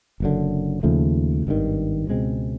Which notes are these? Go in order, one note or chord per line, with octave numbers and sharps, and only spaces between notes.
F#1 F#2 D3
D#2 C#3 F3 A3
G#1 G2 D#3
C#2 B2 G#3 C4